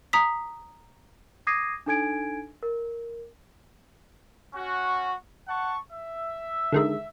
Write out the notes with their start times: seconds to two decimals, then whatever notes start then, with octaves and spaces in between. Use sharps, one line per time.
0.13 A#5 D#6 B6
1.47 D6 D#6 G#6 A#6 C7 D#7
1.86 D4 D#4 A4 G#5 G#6 D7
2.63 A#4
4.54 C#4 F#4
5.48 F#5 A5 C#6
5.92 E5
6.72 D3 D#3 G#3